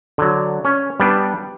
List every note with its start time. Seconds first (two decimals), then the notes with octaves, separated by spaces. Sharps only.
0.18 D3 F#3
0.65 C#4
1.00 G3 B3 D4